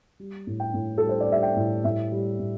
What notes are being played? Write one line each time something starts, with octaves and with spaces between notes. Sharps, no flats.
G3
A2
G5
A2
G3 A4
C5
D5
G3 E5
G5
A2
A2 E5
G3
A2